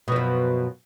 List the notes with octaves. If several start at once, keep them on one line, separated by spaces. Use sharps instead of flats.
F#2 B2 F3